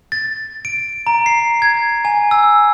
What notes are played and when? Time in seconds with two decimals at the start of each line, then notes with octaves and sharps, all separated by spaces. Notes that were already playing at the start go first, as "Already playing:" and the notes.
0.12 A6
0.65 D7
1.07 A#5
1.26 C7
1.62 G#6
2.05 G#5
2.31 E6